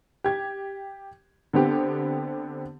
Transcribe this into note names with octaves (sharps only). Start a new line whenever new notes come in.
G4 G#6
D3 B3 C4 G4